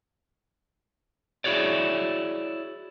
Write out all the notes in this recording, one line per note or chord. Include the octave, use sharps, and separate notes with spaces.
E4 F#4 G#4 C#5 D5